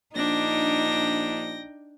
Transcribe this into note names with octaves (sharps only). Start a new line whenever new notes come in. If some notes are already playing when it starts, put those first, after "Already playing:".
A#1 D4 D#4 G5 A#6